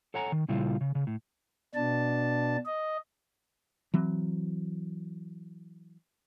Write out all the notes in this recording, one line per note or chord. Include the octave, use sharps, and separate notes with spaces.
A4 C#5 F#5 G#5 A#5
D#3
A#2 C#3 G3 E4 F4
C#3
C#3
A2
B2 D4 A5
D#5
E3 F#3 C4